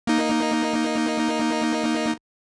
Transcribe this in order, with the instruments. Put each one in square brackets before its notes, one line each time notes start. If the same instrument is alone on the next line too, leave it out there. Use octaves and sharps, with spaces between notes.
[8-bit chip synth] A#3 D#4